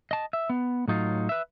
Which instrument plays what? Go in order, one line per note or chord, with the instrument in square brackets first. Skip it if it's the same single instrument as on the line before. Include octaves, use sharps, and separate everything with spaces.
[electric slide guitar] D#5 A5
E5
B3
A2 F#3 D#4 F4
B4 E5